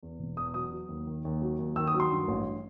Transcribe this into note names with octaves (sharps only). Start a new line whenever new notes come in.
E2
E1
E2 D#6
F#3 D#6
F#3
D#2
D#3
D#2
F#3
D#2
D#3 E6
D#6
F#3
C6
G2
A1